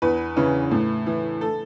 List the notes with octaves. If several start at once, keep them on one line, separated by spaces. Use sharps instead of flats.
E2 B4
C#3 E3
A2
E3
A4